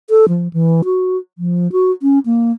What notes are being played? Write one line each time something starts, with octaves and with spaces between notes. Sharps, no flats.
A4
F3
E3
F#4
F3
F#4
C#4
A#3